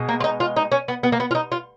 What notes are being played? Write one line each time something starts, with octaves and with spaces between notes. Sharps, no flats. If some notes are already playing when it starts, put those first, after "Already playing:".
Already playing: B2 G#3
A#3
F4
D#4
F4
D#4
C#4
B3
B3
A#3
B3
F4
D#4
F4